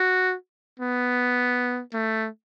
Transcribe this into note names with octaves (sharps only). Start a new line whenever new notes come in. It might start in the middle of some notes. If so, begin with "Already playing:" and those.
Already playing: F#4
B3
A3